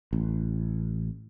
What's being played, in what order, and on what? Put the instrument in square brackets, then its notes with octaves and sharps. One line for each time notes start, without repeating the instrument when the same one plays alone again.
[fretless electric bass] A1